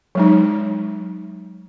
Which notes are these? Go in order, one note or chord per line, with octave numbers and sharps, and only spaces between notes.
F#3 G#3 D#4